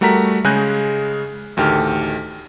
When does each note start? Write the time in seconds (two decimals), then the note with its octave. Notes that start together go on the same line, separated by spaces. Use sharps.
0.01 G3 A3 F#4 A#4 A#5 B6
0.44 C#3 G#3 G#5 F#6 G6 A#6
1.57 A1 D2 D#3 G4 A4 F6